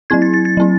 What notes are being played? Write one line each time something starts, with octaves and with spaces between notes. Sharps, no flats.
F#3 C4 E4 G#6
A6
A6
A6
F#3 C4 E4